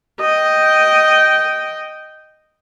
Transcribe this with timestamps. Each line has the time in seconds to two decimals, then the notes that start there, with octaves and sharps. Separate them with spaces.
0.20 D#5 G5